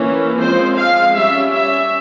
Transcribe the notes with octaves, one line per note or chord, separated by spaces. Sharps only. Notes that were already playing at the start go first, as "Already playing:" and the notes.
Already playing: E3 A#3 C#4
F3 G#3 C4 C5
F5
G3 C#4 E5
E5